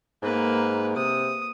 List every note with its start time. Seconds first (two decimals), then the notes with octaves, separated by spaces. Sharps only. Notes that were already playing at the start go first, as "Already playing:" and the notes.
0.22 G#2 A#3 B4
0.96 C3 D#6